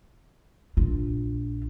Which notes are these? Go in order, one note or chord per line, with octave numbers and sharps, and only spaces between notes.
A#1 F4